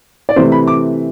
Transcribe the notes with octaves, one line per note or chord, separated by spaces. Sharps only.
D5
C3 E3 A3 C4 C5
B5
D6